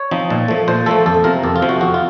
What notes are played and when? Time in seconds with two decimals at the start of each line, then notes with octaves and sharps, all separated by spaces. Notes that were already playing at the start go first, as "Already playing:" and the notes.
Already playing: C#5
0.11 F3 C4 D#4
0.30 A#2
0.48 F3 A3
0.68 A#2 C5
0.86 F3 A3 A4
1.06 F2 A4
1.24 C3 F3 C4 A#4
1.43 F2 A4
1.56 F4
1.62 C3 F3 C4
1.69 F#4
1.81 F2 F#4
1.94 F4